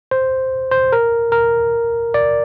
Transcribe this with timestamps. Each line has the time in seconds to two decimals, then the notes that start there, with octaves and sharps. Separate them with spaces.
0.11 C5
0.71 C5
0.92 A#4
1.32 A#4
2.14 D5